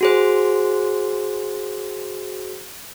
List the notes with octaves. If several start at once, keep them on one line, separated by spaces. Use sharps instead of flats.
F#4 G#4 C5